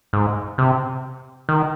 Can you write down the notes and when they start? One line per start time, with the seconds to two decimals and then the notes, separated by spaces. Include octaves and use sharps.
0.13 G#2
0.58 C3
1.49 D#3